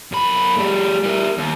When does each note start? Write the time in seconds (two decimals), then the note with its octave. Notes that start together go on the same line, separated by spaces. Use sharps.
0.12 F#2 B5
0.58 G3 A3
1.03 G3 A#4
1.38 D#2